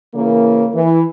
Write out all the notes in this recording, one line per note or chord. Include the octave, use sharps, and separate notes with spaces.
C#3 E3 A#3
E3